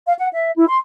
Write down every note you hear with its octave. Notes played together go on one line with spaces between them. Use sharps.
F5
F#5
E5
E4
C6